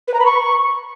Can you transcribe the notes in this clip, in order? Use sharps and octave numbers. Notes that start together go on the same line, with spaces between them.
B4
A#5
B5
C#6